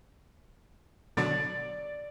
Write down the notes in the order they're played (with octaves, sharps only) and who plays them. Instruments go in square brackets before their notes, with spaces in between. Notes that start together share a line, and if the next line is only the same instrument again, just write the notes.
[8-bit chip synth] B2 D3 F#3 [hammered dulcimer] D5